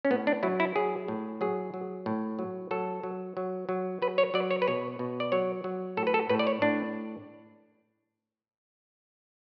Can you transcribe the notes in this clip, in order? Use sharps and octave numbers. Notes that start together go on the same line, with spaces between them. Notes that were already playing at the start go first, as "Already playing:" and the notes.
C#4
A2 B3
D4
F#3 E4
E4
F#3 G#4
A2
F#3 G#4
F#3
A2
F#3
F#3 A4
F#3
F#3
F#3
F#3 B4
C#5
F#3 D5
C#5
B4
B2 C#5
B2
D5
F#3 C#5
F#3
A2 A4
B4
A4
A2 B4
D5
C#5
A2 D4